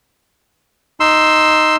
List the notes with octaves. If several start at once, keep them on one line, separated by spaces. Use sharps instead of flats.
D#4 C6 E6